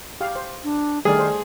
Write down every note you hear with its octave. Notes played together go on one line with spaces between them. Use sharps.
G4 F5
C5
D4
D#3 G3 A3 G#4 D5
C5